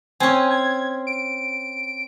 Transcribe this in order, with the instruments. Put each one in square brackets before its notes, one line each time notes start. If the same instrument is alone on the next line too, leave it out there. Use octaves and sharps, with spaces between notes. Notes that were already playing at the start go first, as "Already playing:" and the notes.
[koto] C4 C#4 [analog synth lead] G#5
[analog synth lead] G#6
D7